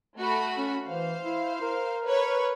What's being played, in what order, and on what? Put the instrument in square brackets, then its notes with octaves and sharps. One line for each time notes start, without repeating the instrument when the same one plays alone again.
[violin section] A3 F#4 B5
[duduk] C#4
[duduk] E3 [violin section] C5 F5
[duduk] E4
A#4
[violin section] B4 C#5